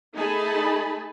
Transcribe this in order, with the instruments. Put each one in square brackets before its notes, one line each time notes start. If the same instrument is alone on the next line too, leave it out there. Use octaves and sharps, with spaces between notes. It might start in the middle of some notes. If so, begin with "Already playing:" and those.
[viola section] A3 D#4 G#4 G#5 A5 B5